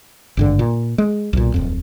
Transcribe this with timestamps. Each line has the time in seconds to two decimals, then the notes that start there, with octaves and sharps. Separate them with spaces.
0.37 G#1 G2 D3
0.59 A#2
0.98 G#3
1.33 B1 A#2
1.54 D1 F2